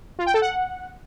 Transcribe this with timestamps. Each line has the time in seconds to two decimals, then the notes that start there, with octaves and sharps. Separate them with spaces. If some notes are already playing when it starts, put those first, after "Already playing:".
0.19 F4
0.26 G5
0.34 A4
0.42 F#5